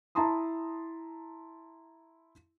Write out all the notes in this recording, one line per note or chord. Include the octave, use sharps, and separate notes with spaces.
E4 A5 A#5 C6 D#6